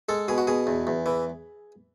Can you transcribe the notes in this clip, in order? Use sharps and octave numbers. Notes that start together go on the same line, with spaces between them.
G#3 A4
B2 G#4
F#4
B2 G#4
E2
E2
E3